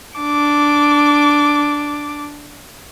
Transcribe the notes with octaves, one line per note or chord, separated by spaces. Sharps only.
D4 D6